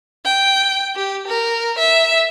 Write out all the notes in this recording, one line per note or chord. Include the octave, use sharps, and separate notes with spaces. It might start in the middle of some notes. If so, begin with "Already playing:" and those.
G5
G4
A#4
E5